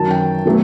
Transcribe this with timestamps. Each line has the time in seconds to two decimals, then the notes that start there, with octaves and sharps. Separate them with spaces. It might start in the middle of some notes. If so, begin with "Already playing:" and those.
Already playing: F#2 D#3 F#3 A5
0.11 G5
0.45 B2 F#3 A3